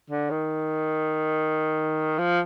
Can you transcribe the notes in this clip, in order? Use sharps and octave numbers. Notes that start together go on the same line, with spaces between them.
D3
D#3
F3